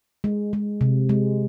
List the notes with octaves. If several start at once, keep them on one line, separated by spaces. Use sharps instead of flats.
G#3
G#3
C3
G#3